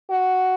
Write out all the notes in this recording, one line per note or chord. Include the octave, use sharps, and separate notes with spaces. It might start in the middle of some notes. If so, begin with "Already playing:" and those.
F#4